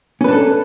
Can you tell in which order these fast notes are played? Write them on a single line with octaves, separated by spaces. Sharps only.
C#4 B4 D4 A4